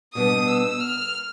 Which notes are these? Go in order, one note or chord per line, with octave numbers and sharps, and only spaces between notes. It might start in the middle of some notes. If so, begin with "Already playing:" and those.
B2 G3 B3 D4 D#6
E6
F6